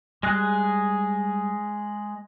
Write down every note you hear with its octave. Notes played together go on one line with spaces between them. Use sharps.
G3 G#3 G#4 F#6